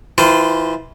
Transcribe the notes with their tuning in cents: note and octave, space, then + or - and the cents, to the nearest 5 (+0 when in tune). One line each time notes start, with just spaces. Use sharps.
E3 -25 F4 +0 C5 -30